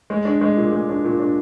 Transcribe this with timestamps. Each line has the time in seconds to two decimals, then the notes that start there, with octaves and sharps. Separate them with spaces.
0.10 G#3
0.25 D4
0.41 G#3
0.57 A#2
0.72 G#3
0.89 D4
1.04 A#2
1.19 D4